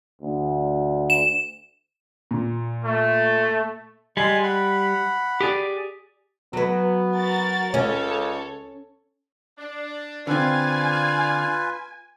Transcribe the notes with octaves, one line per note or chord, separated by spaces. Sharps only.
D2
E7
A#2
A3
G3 G#3 G#5 C6
F#5 B5
G4 G#4 D5
F#3 B3 B4
F#4 A#4 A6
C#2 C#4 A4 C#5
D4
D3 C4 F4 B4 D5 F5 G#5